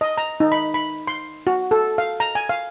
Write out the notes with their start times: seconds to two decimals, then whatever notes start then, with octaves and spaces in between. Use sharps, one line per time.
0.01 D#5
0.17 A#5
0.40 D#4
0.52 B5
0.74 B5
1.07 C6
1.47 F#4
1.71 A4
1.98 F5
2.20 A#5
2.35 G#5
2.49 F5